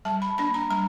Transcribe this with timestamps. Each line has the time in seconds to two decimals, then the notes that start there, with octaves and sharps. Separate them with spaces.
0.05 G3 A5
0.22 B5
0.38 A#3 D4 B5
0.54 A#5
0.71 G3 A#5